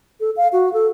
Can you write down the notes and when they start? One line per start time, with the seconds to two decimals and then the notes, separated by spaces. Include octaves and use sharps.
0.20 A4
0.37 F5
0.53 F#4
0.73 A4